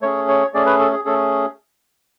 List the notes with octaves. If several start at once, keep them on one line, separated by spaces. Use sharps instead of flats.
A3 C#4 G#4 C#5
C#5
A3 C#4 G#4 D5
B4
A4
G#4
A3 C#4 G#4 A4